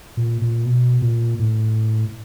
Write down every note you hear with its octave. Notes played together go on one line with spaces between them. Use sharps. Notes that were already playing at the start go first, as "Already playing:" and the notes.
A#2
A#2
B2
A#2
A2